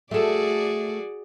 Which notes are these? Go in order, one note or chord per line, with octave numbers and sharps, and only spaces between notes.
A3 F#4 G#4 A4 D5